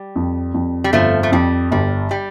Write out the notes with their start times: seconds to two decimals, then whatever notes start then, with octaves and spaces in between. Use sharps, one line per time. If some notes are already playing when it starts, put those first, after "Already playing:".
Already playing: G3
0.16 F2
0.54 F2
0.84 G3
0.93 G1 F3 A3
1.23 A3
1.32 F2 G3
1.71 G1 G3
2.11 G3